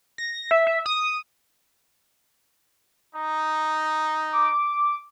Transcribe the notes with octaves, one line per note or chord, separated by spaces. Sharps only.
A#6
E5
E5
D#6
D#4
D6